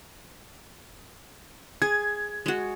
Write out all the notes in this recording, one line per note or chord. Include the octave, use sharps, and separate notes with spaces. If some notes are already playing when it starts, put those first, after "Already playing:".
G#4 G#6
G#3 F#4